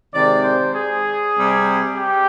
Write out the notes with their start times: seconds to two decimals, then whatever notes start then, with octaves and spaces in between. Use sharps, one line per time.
0.13 C3 D#3 G#3 D5
0.44 C5
0.75 G#4
1.35 C3 G3
1.97 G4